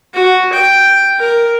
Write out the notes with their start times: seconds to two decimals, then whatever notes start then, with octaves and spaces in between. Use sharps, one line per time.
0.14 F#4
0.53 G5
1.19 A#4